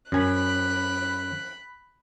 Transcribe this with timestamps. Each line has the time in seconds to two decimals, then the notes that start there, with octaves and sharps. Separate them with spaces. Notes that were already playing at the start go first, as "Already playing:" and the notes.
0.12 F#2 G#5 B5 F#6